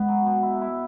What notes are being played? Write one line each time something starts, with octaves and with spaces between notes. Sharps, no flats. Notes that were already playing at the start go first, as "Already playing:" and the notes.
Already playing: G#3 B3
F#3
B2
E4
E4